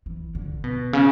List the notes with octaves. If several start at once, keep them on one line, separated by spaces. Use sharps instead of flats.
E3
D3
B2
C#3